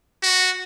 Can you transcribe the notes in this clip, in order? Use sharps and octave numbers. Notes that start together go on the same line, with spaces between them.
F#4